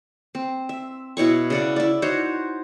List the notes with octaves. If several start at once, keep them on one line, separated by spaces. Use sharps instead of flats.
C4
E5
B2 E4 C#5 C#6
C#3 D5 F#5
E4 D5
D#4 F#4 C5 C#5